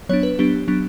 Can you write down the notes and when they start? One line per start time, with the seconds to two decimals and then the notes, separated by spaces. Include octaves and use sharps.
0.09 F#3 B3 D4 C#5
0.23 B4
0.39 F#3 B3 D4 G4
0.68 F#3 B3 D4